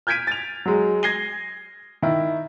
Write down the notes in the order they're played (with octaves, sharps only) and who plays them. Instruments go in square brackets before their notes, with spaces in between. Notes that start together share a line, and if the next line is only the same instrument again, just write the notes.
[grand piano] F6 G6 G#6 B6 D7 D#7
A6 F7
F#3 G#3
G#6 A#6 C7 D#7 G7
D#3 E4